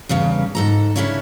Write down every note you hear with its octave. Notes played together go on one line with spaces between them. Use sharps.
E2 G2 C#3 C#4
G#2 A4 A#5
C#3 A#3 C#4 D4 E4 C#5